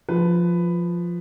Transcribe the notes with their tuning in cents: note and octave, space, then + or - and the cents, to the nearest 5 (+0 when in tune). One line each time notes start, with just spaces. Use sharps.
F3 +0 B4 +10